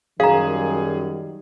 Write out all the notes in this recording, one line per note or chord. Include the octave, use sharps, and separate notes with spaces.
F#2 D#3 F#3 G3 G#4 F5 A#5